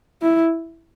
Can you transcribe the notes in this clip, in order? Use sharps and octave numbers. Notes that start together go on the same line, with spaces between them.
E4